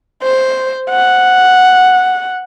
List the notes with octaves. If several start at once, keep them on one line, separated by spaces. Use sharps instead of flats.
C5
F#5